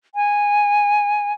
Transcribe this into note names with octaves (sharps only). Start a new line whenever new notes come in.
G#5